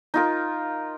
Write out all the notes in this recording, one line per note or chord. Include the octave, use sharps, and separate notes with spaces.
D#4 F4 A#4